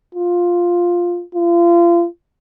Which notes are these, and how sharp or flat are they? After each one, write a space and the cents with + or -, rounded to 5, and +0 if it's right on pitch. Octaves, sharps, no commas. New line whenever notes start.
F4 +5
F4 -30